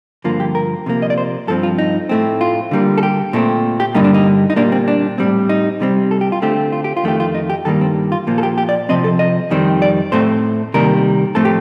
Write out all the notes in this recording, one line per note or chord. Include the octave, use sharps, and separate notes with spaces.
G2 D3 F3 A#3 F4
G4
A#4
C3 F3 A#3
D#5
D5
C5
G2 F3 C4 A4
F4
D#4
A2 A3 C4
F4
D3 G3 A#3
A4
G4
A#2 A3 C4
G4
G2 D3 G3 A#3 D#4
D4
D#4
D#4
A#2 G3 A#3 D4
C4
D4
A2 G3 C4
D#4
C3 G3 C4
A4
G4
F4
D3 A3 C4 G4
F4
G4
F4
F2 D#3 A3 G4
F4
D#4
G4
G2 D#3 G3 A#3 A4
C4
F4
A#2 F3 A#3
A4
G4
G4
D5
C3 F3 C4 D#5
A4
D#5
F2 D#3 G3 C4
D5
A2 A3 C4 C5
C3 D#3 G3 A#3 A#4
A2 F3 A3 C4 A4
G4